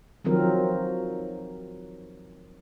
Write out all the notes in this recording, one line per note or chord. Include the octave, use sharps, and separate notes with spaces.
D#3 F3 F#3 C4 A#4